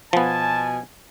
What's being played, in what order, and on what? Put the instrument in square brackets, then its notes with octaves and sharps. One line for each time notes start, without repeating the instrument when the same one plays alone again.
[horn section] B2 G#5 [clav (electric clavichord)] F3 B3 [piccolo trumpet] A5